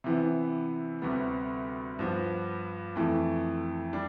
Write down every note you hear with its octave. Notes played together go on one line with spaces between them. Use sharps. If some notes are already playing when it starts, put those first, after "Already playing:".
C3 E3 B3
D2 C3 G3 B3
G2 F3 B3
F2 E3 A3
G3 D4